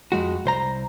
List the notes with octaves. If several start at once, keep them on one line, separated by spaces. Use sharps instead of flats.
F2 G#3 F#4
C2 C5 A#5